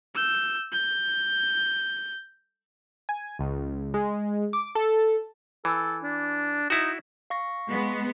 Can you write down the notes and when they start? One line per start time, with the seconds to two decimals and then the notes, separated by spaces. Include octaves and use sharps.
0.15 E6 G6
0.72 G6
3.09 G#5
3.39 C#2
3.94 G#3
4.53 D6
4.75 A4
5.65 E3 A4
6.03 D4
6.70 D#4 E4 F#4
7.30 F5 C#6 A#6
7.69 G#3 B3